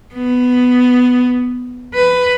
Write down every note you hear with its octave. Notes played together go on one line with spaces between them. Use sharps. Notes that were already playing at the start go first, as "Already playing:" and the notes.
B3
B4